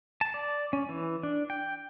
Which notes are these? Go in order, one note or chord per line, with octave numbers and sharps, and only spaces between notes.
A5
D5
C#4
E3
D4
G5